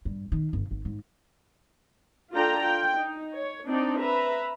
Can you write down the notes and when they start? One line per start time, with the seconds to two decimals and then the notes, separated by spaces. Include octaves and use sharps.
0.05 G2
0.32 D#3
0.53 G1
0.71 G#1
0.85 G#2
2.33 D4 F4 A4 D5 G5 A#5
2.63 F4 G5
2.96 D#4
3.34 C#5
3.69 C4 D4 D#4 D5
3.99 B4 E5 A#5